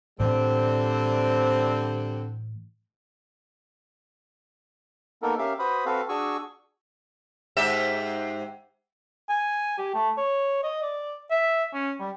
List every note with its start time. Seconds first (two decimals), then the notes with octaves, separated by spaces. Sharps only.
0.20 A2 D3 E3 G3 A3 C4
5.22 A#3 B3 D#4 A4 A#4
5.38 C#4 G4 A#4 E5 F5
5.59 F#4 B4 C5 B5 D#6
5.86 C4 F#4 A4 B4 F5
6.09 D4 F#4 G#4 G#5 C#6 E6
7.57 G#2 G4 E5
9.29 G#5
9.78 G4
9.95 A3
10.17 C#5
10.63 D#5
10.83 D5
11.31 E5
11.74 C#4
12.00 G3